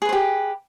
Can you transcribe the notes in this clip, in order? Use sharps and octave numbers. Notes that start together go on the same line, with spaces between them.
G4 G#4 B4 C5